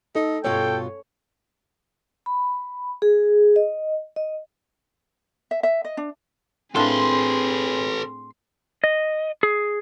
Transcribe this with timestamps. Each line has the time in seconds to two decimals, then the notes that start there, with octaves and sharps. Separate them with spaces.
0.15 D#4 A4
0.44 G2 B2 F4 A4 C#5 G5
2.26 B5
3.02 G#4
3.56 D#5
4.16 D#5
5.51 E5
5.63 E5
5.85 D#5
5.97 D4
6.76 A2 A#3 C4 D4 G#4 A4 B4 C6
8.84 D#5
9.43 G#4